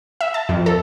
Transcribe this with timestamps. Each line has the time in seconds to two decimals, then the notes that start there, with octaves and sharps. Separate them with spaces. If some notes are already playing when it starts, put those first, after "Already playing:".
0.21 E5
0.34 A5
0.49 F2
0.66 A4